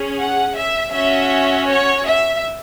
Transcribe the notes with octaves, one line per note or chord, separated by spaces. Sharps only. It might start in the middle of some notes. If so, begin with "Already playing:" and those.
Already playing: C#4 G#4
F#5
E5
C#4 F#4 E5
C#5
E5